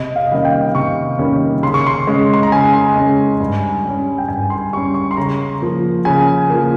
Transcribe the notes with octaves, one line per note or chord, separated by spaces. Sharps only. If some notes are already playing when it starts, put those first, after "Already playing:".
Already playing: C3 D#5
F5
D#5
D#3 G3 A#3 C#4 F5
G5
C3 C#6
D#3 G3 A#3 C#4
C#3 C6
C#6
C6
G#3 C#4
C6
A#5
C#3 G#5
G#3 C#4
G2
G3 C#4
G5
G2 G#5
C6
G3 C#4 C#6
C#6
C6
C#3 A#5
F3 A#3
C#3 G#5
F3 A#3